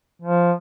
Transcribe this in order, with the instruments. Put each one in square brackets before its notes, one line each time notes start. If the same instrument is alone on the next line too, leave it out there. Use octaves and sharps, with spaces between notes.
[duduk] F3